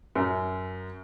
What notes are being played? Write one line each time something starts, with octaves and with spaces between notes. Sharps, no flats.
F#2